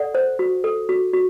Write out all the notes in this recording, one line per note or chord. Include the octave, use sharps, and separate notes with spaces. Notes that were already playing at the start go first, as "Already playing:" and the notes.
Already playing: A4 D5 F#5
C5
F#4
A4
F#4
F#4